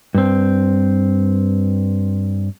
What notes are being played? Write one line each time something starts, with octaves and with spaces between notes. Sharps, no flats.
G2 C4